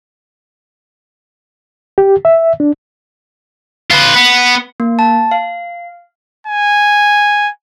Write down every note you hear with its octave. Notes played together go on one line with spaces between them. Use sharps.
G4
E5
D4
F4 B4
B3
A#3
A5
F5
G#5